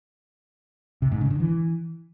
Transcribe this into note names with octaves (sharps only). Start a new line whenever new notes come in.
C3
G#2
C#3
D3
E3